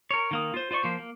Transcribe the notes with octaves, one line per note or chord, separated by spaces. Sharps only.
A#4 C#5
D#3 A#3 D#6
F4 C5
F4 C5 D5 C#6
F3 A#3 C5
A#3